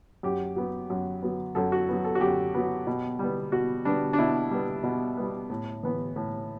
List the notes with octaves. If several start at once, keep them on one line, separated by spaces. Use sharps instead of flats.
F#2 G4
F#3 B3
F#2
F#3 B3
F#2 A4
F#4
F#3 B3
A4
F#4
F#2 G4
F#3 B3
B2
G3 B3
B2 F#4
G3 B3 D4
D4
B2 E4
G3 B3
B2
G3 B3
A2
E3 B3
A2